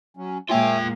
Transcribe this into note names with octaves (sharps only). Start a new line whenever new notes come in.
F#3 C#4
A#2 G#3 A#3 F4 C#5 E5 G5 G#5